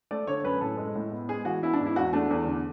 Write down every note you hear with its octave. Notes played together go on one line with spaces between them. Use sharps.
A3 D5
D3 C#5
F#2 B4
A2 A4
G#3
A2
B3
G#3 G#4
E3 F#4
B3 E4
D4
G#2
E4
E2 F#4
A3 D4
E2
D3